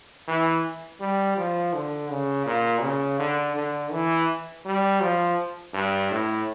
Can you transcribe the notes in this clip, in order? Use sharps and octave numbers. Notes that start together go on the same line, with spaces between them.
E3
G3
F3
D3
C#3
A#2
C#3
D3
D3
E3
G3
F3
G2
A2